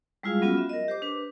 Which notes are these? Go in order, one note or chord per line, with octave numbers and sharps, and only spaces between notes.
G3 G#3 E4 F4 G#4 F5
F#3 B3 C#4 F4 F#4
E5
A#4 D#5
G4 C5 D6
D4 B4